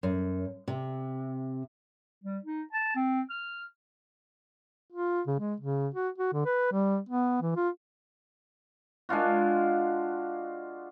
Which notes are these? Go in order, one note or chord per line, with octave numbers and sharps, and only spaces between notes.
F#2
C3
G3
D#4
A5
C4
F6
F4
C#3
G#3
C#3
F#4
F#4
D3
B4
G3
B3
E3
F4
G#3 D4 F4 F#4